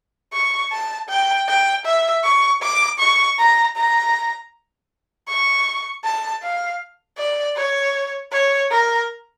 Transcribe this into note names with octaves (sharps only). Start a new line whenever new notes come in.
C#6
A5
G5
G5
E5
C#6
D6
C#6
A#5
A#5
C#6
A5
F5
D5
C#5
C#5
A#4